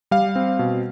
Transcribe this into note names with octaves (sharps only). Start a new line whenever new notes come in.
G3 F5
C4
B2